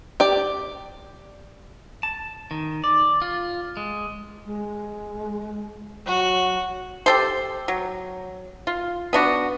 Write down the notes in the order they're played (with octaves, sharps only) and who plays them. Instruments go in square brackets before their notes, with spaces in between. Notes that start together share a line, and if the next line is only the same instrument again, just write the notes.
[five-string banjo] G4 D5
[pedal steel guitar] A5
D#3
D5
F4
G#3
[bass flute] G#3
[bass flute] F#3 [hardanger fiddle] F#4
[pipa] G4 A4 C5
F#3
F4
B3 D4 F#4